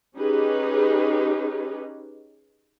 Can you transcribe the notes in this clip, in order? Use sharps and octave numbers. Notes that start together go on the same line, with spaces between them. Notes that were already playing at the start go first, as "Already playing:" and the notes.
C#4 D#4 G4 G#4 B4